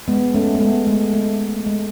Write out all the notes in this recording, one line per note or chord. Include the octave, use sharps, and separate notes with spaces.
G#3 B3
A3 C#4
A3
G#3 B3
G#3
A3
G#3